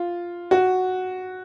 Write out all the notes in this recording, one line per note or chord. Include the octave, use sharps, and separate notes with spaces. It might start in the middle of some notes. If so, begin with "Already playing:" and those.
Already playing: F4
F#4